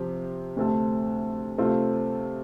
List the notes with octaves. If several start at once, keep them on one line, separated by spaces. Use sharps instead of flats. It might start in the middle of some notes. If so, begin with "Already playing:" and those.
Already playing: C3 F3 C4 G4
D2 C3 A3 C4 A4
C3 A3 C4 F4 A4